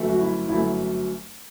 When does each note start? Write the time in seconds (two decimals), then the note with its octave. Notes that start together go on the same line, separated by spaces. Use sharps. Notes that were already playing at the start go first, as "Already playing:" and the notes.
Already playing: G1 F#2 F#3 A3
0.09 F#4
0.20 E4
0.48 G1 F#2 F#3 A3 E4